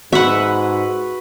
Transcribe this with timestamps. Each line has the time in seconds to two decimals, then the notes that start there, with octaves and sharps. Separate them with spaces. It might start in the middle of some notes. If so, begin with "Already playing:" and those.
0.13 G#2 F#4 B4 E5 F#5